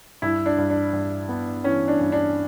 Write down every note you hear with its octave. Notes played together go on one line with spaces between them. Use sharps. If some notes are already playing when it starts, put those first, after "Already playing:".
G2 E4
D4
G2
D4
G2
B3
E3 C#4
D4
G2
D4